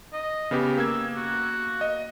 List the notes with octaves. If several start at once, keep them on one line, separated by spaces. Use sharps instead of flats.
D#5
C#3 B3 G4
A#3 E6 G#6
F#4
D#5